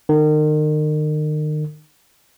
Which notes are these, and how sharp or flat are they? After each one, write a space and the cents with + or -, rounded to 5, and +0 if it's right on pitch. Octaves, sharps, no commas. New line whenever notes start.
D#3 -35